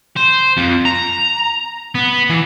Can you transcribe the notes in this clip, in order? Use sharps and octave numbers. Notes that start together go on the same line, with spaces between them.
C5
F2
A#5
B3
E3